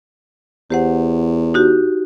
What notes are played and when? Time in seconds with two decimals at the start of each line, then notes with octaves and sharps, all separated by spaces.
0.70 E2 G4 C5 F#5
1.54 D#4 F#4 G4